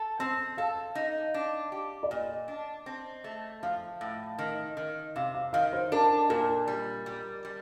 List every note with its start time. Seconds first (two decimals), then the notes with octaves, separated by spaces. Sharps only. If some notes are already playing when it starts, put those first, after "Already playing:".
Already playing: A4
0.19 C4 A5
0.57 A4 F5
0.95 D#4
1.34 D4
1.72 G4
2.03 D5
2.11 A#2 D#5
2.48 D4
2.86 C4
3.24 A3
3.63 F3 F5
4.01 A2
4.39 D#3
4.77 D#3
5.16 C3 F5
5.34 F5
5.53 D#3 F5
5.73 C5
5.92 D4 A#4
6.30 A#2 A#4
6.68 G3
7.06 G3
7.45 G3